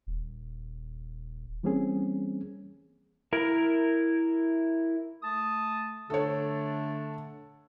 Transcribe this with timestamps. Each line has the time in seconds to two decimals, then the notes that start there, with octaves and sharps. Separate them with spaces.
0.07 D#1
1.63 E3 G3 A#3 C4 C#4 G#4
3.33 E4 A#4
5.23 A3 A5 D#6
6.10 D3 A3 D4 A4 C#5